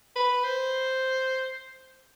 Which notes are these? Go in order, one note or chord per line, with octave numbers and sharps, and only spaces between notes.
B4
C5